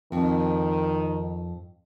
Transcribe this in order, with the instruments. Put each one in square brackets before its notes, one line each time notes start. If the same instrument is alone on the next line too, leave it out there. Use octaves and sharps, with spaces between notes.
[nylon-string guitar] F2 [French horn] D#3